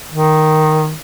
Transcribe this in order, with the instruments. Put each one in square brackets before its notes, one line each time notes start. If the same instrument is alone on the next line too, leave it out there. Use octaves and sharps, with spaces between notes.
[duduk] D#3